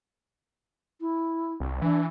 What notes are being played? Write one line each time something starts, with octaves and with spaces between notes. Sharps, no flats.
E4
C2
E3 D4